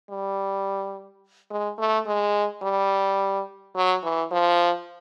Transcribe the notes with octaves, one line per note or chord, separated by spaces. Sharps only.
G3
G#3
A3
G#3
G3
F#3
E3
F3